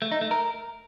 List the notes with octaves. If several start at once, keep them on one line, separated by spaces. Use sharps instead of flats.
A3
D#4
A3
A#4